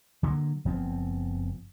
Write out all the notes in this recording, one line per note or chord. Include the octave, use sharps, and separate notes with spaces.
D3 F#3 G3 A#3
F#1 F3 B3 C4